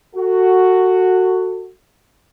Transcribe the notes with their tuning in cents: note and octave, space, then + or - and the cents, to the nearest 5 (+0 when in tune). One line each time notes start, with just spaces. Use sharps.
F#4 +0 A4 +30